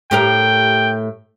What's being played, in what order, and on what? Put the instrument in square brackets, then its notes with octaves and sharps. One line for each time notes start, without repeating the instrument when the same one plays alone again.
[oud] A2 G4 A#4 [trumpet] G5